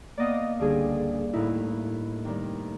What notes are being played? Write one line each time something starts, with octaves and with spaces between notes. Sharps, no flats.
A#3 B3 D5 D#5 F5
C#2 G2 D3 D4 G#4
D#2 A2 D#4 E4
C3 D#3 G3